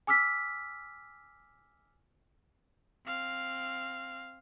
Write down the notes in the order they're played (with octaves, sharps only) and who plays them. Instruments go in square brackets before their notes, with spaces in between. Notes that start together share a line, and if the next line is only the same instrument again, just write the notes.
[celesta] G#5 D6 E6 F6 B6
[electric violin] C4 F5